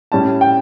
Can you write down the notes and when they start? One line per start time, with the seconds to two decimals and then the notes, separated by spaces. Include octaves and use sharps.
0.12 A2 G3 C#4 E4 A5
0.41 G5